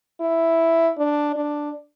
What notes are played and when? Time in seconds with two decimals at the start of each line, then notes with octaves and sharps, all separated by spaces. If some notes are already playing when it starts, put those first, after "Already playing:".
0.20 E4
0.98 D4
1.35 D4